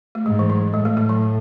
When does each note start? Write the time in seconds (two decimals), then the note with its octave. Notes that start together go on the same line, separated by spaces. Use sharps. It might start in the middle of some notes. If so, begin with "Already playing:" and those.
0.15 A3
0.26 G#2 G#3
0.39 E3
0.50 F#3
0.73 A2 G#3
0.85 A3
0.97 A3
1.09 F#3